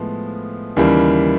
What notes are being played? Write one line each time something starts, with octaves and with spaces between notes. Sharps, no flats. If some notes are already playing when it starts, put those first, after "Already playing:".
Already playing: A2 F3 G#3 B3
D#2 C#3 E3 G3 A#3